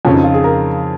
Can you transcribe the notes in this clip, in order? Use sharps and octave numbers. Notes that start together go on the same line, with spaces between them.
F2 C#3 C#4
D#4
F4
G#4
A#4